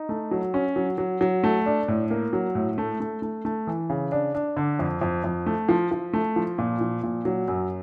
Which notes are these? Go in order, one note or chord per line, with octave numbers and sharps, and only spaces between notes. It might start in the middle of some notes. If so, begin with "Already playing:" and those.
Already playing: D#4
A3
F#3
C#4
F#3
F#3
F#3
A3
D4
A2
A#3
F#3
A2
A3
A3
A3
A3
E3
C#3
D4
D4
D3
F2
F2
F2
A3
F3
F3
A3
F3
A#2
F3
A#2
F#3
F#2